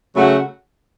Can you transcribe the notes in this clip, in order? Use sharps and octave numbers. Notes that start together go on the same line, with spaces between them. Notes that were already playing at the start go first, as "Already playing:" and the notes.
C#3 F#3 A3 F#4